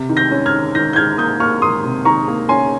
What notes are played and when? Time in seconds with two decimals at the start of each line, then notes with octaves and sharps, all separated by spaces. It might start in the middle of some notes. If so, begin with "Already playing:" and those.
Already playing: C3
0.09 D#3
0.17 G6 A#6
0.32 C#4
0.46 F6 G#6
0.53 D#3
0.75 D#3 G6 A#6
0.93 G6
0.96 D#3 F6 G#6
1.18 A#3 D#6 G6
1.40 A#3 C#6 F6
1.62 A#3 C6 D#6
1.84 C3
2.05 D#3 A#5 C#6
2.28 A#3
2.49 C#4 G#5 C6